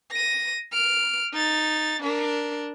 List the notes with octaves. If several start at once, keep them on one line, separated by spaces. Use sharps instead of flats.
A#6 D#7
F6 D7
D#4 A6
D4 A#4